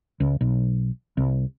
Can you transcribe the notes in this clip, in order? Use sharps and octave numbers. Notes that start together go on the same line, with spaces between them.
C#2
B1
C2